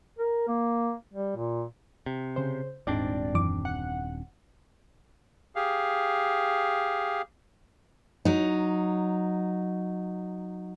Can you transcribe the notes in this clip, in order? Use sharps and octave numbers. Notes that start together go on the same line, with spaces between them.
A#4
A#3
G3
A#2
C3
C#3 C5
D#1 G#2 C4 D4 D5
F#2 E3 D6
F#5
G4 G#4 F5
F#3 D#4